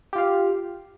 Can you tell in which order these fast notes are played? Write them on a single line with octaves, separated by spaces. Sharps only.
G4 F4 F5